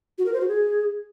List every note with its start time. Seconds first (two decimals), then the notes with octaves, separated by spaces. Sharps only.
0.18 F#4
0.26 A#4
0.33 C5
0.41 F#4
0.48 G#4